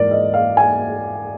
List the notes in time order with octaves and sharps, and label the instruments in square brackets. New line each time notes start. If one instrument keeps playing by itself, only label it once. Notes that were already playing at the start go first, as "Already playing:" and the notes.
Already playing: [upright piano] G#2 E3 A#4 D5
D#5
F5
G#5